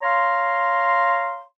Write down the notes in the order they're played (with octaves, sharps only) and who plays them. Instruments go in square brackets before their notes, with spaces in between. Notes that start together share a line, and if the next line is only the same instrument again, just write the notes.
[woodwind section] C#5 F5 A#5 C6